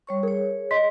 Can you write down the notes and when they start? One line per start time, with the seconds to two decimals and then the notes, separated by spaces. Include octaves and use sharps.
0.07 G3 C#5 C#6
0.23 G#4 A#4 C#5
0.71 D#5 C6 B6